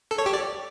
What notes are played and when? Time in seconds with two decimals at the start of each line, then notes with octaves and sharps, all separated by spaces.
0.11 A4
0.18 C#5
0.26 G4
0.33 D5